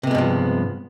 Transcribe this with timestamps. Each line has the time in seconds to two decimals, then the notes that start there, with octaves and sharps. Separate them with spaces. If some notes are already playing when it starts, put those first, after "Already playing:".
0.03 C3
0.07 B3
0.11 G#3
0.15 G2
0.18 F3